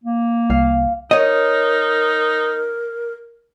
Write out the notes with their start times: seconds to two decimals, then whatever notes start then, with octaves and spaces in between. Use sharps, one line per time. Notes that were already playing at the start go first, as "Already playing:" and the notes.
0.04 A#3
0.50 C2 F5
1.11 D#4 A#4 C#5 D#5